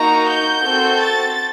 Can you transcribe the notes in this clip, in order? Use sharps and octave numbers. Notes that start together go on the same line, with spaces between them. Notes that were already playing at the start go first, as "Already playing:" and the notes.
Already playing: A#3 D#4 F#4 A#5
G6
C4 F#4 A4
A6